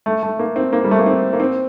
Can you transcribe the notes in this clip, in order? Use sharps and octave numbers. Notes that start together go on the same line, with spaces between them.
A3
A3
A#3
C4
A#3
G3
A3
A#3
C4
A#3
C4